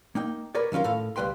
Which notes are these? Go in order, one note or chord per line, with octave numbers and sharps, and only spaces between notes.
A#3 D#4 G5
A#4 B4 C#5 D5
D#3 F#3 C#4 F4 A#4
A2 A4 F5
C#2 G3 B4 G5 C6